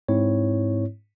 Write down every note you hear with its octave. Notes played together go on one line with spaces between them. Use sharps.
G#2 C4 E4 C#5